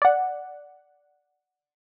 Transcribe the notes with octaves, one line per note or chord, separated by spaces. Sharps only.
D5 F#5